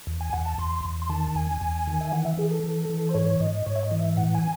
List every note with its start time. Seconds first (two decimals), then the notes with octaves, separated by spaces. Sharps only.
0.07 E2
0.21 G#5
0.33 E2 F#5
0.45 A5
0.58 E2 C6
0.85 E2
1.02 C6
1.09 D#3 A5
1.35 E2 G#5
1.61 E2
1.87 D#3
2.01 E5
2.12 E3 F#5
2.25 E5
2.37 E3 G#4
2.51 A4
2.64 E3
2.90 E3
3.09 C5
3.14 G#2 C#5
3.40 G#2 D#5
3.66 G#2 C#5
3.76 E5
3.83 D#5
3.91 E3
4.00 E5
4.17 A2 F#5
4.35 G#5